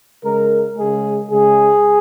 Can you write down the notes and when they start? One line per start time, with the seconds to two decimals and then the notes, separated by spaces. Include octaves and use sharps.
0.24 C#3 G#3 A#4
0.77 C#3 G#3 G#4
1.30 C#3 G#3 G#4